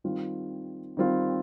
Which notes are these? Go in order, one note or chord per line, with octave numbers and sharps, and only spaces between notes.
D#3 G3 C4 F4
D#3 G3 C4 F4